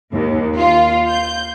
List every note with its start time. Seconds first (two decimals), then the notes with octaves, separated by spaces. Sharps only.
0.13 D#2
0.57 F4
1.09 G6